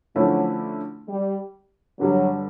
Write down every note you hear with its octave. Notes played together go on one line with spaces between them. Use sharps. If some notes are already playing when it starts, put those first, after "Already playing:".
D3 F3 F#3 A3 C#4 E4
G3
G2 D3 F#3 G3